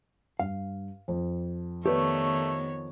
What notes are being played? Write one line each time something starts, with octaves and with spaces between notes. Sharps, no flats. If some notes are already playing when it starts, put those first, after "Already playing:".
G2 F5
F2
D#3 A3 B3 G4 B4 C#5 D5